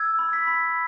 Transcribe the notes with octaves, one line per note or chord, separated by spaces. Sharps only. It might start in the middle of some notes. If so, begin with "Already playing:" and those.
Already playing: E6 G#6
B5
B6
B5